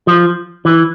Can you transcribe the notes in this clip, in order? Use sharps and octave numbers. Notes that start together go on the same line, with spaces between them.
F3
E3